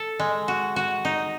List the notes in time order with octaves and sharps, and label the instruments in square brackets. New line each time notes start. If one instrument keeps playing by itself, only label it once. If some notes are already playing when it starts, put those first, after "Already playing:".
Already playing: [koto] A4
G#3
F#4
F#4
D#4